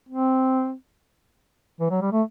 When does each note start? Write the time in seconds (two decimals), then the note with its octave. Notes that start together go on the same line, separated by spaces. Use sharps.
0.09 C4
1.80 E3
1.90 F#3
2.01 G3
2.12 A3